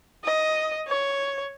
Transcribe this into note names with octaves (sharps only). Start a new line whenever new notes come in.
D#5
C#5